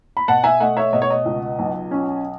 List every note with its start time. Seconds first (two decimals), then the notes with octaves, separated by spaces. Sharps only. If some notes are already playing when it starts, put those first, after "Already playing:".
0.17 B5
0.28 B2 F#5 A5
0.44 E5 G#5
0.60 A3 D#5 F#5
0.77 C#5 E5
0.93 B2 D#5
1.02 C#5
1.10 D#5
1.25 C#2
1.59 B1
1.91 C#4